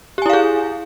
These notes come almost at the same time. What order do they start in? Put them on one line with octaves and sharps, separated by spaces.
G4 G#5 E4 F5 G#4